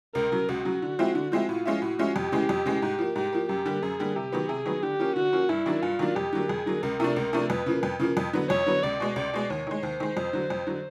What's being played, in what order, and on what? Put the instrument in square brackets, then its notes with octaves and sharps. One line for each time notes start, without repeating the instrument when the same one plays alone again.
[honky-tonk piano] C#2 [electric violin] A#4
[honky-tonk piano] C#3 F#3
[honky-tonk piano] C#2 [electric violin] F#4
[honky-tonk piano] C#3 F#3
D3
F3 G#3 C4 E4
D3
F3 G#3 C4 E4
[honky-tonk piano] A2 [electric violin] F4
[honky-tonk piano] F3 G#3 C#4 E4
[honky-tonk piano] A2 [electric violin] F#4
[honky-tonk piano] F3 G#3 C#4 E4
[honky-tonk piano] F2 [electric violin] G4
[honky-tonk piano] C#3 E3 G#3
F2
C#3 E3 G#3
G#2
F3 A#3
[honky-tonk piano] G#2 [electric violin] G4
[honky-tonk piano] F3 A#3
[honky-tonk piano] F#2 [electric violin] G4
[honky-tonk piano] D3 G3 A#3
[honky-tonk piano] F#2 [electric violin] G#4
[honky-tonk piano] D3 G3 A#3
[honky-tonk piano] C3 [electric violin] G4
[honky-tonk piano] D#3 F#3 B3
[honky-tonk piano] C3 [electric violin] G#4
[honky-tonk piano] D#3 F#3 B3
[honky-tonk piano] D3 [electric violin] G4
[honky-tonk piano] F3 A#3 C#4
[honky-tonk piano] D3 [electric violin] F#4
[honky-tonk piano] F3 A#3 C#4
[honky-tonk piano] G2 [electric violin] E4
[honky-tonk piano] D#3 F#3 A#3 D4
[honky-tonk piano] G2 [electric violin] F4
[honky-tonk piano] D#3 F#3 A#3 D4
[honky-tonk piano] F2 [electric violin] G4
[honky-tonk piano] D3 F#3 A#3
[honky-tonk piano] F2 [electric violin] G#4
[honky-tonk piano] D3 F#3 A#3
[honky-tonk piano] C#2 [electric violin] A#4
[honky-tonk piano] C3 F3 A3 D4
C#2
C3 F3 A3 D4
[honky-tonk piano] F2 [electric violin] B4
[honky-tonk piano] C#3 F3 A#3
F2
C#3 F3 A#3
F2
D3 F#3 B3
[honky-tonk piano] F2 [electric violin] C#5
[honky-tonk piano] D3 F#3 B3
[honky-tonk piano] C#2 [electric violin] D5
[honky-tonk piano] B2 G#3
[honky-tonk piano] C#2 [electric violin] D5
[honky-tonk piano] B2 G#3
[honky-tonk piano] D#2 [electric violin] C#5
[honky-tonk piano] D#3 G#3
[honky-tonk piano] D#2 [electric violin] C5
[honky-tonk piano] D#3 G#3
F2
D3 F#3
F2
D3 F#3